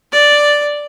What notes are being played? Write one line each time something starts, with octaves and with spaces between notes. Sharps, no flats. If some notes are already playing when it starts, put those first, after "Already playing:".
D5